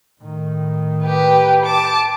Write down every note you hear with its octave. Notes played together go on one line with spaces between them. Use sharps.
A2 D#3
G4 B4
A5 D6